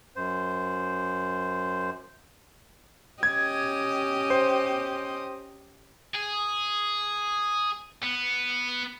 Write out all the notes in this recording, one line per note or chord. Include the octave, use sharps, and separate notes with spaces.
F#2 C5
C#4 G4 D#5 G#6
C5
G#4
B3